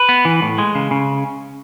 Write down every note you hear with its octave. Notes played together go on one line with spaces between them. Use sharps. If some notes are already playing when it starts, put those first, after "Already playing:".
Already playing: B4
B3
E3
A2
G#3
C#3
C#3